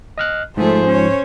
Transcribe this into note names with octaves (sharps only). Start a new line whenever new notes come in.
D#5 F6 F#6
G#2 F3 A3 G#4 A4 C5
C#4 C#5